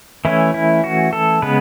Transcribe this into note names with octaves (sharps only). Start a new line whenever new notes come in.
E3 A3 C#4 E4
E4
F#4
A4
C#3 G#3 B3 B4